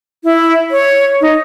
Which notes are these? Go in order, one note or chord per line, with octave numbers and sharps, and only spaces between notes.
E4
C#5
D#4